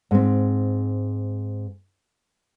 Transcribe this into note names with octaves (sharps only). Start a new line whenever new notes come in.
G#2 C4